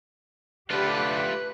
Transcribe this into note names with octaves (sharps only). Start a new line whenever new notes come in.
D3 A3 F4 G4 B4 B5